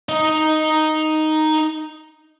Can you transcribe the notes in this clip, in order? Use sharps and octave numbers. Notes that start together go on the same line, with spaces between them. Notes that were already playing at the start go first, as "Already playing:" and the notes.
D#4 D#5